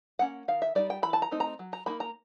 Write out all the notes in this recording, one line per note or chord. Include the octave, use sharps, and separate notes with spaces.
A#3 C#4 F#5
D#3 F5
E5
G3 A#3 D#4 D5
G5
E3 B5
A5
A#5
A3 C4 D#4
A#5
F#3
A#5
A#3 D#4 B5
A#5